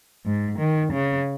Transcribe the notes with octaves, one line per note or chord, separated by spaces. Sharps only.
G#2
D#3
C#3